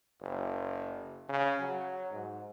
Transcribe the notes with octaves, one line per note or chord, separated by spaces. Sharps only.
F#1
C#3
F#3
G#2